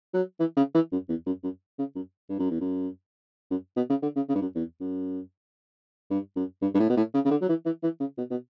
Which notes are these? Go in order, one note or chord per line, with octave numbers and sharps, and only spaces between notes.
F#3
E3
C#3
E3
F#2
E2
F#2
F#2
C#3
F#2
G2
F#2
E2
F#2
F#2
B2
C#3
D3
C#3
C#3
G2
F#2
E2
F#2
G2
F#2
G2
G2
A2
B2
A2
C#3
C#3
D3
F#3
E3
E3
E3
C#3
B2
B2